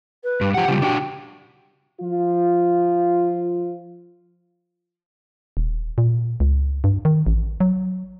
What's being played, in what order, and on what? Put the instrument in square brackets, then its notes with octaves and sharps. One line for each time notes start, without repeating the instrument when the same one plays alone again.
[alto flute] B4
[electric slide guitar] G2
[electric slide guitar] F3 F#5 [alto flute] G4
[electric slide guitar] C#3 F3 G3
D4 F#4 G5
[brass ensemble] F3 F4
[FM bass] D#1
A#2
C#2
G2
D#3
A1
F#3